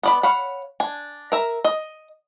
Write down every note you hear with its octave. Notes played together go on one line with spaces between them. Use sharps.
B3 D5 B5
C#5 F5 F#5 B5
D4 G#5
A#4 E5 A#5
D#5